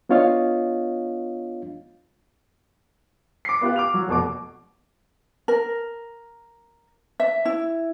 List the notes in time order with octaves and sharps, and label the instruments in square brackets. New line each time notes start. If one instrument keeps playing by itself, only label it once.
[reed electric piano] B3 D4 F4 C#5 D#5 F5
[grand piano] D6 C7
B3 F4 G4 F5
D6 F6 F7
F#3
F1 B2 D6
[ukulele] A#4
E5
E4